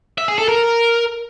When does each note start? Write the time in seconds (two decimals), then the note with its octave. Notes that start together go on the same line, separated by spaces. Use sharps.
0.18 E5
0.28 G#4
0.38 A4
0.48 A#4